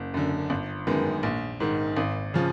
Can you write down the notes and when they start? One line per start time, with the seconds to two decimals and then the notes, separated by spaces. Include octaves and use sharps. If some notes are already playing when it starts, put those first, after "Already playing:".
Already playing: F#1
0.14 F#2 D3
0.50 G1
0.87 F#2 D#3 G#3 B3
1.23 A#1
1.60 G#2 D#3
1.97 G#1
2.34 C#3 F3